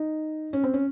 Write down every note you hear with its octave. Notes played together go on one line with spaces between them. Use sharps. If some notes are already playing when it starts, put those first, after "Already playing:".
Already playing: D#4
C#4
C4
C#4